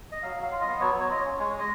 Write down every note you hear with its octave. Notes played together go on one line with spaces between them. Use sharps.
D#5
F#3 F5
F#3
F5
F4
D#5
B3
F#3 C#5
F#3 C#5
F4 D#5
C#4 C#5
G#3 C#5
G#3
D#5